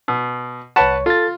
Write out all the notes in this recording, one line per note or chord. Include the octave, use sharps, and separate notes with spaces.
B2
C2 B4 C#5 F#5 A5 C#6
F4 A4 A6